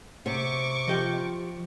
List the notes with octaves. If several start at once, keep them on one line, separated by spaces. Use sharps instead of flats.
C3 F#5 C#6 D6
F3 F4 G4 D#5